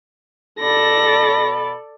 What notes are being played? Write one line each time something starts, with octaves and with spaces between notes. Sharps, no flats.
B2 A4 D5 B5 A#6